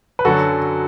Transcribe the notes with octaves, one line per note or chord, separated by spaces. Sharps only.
B4
F#2 D3 F#3 F#4 A4